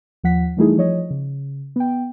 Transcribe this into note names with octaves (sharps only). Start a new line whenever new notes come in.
D#2 F3 F#5 B6
E3 G3 A3 D#4 E4 G#4
F3 C#5 D#5
C#3
B3 G5